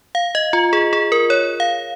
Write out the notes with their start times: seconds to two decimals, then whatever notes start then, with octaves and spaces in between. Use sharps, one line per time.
0.15 F5
0.35 D#5
0.53 F4
0.73 G#4
0.93 G#4
1.12 A#4
1.30 C#5
1.60 F5